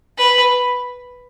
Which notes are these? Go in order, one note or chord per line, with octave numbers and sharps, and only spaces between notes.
B4